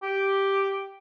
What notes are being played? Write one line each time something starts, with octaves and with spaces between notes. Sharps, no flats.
G4